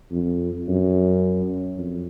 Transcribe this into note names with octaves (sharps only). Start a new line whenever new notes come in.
F2
F#2
F2